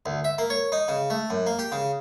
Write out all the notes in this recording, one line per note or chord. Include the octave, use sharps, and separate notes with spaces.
D2
E5
A#3
C#5
D#4
C#3
A3
F#2
A#3
G4
C#3